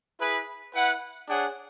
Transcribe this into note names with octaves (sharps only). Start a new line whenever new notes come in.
E4 G#4 B4
E4 B4 F#5
D4 G#4 C#5 F#5